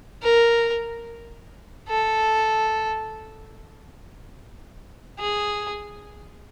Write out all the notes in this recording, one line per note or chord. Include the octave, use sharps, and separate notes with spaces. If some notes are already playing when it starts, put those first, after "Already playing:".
A#4
A4
G#4